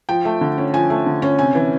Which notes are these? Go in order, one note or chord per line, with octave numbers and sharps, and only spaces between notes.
F3 G5
A3
D3
C#4
F3 G#5
A3
D3
C#4
C3 G#5
E3